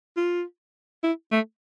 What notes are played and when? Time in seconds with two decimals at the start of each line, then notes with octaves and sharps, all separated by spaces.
0.16 F4
1.03 E4
1.31 A3